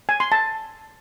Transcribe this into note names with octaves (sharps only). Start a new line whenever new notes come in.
G#5
C6
A5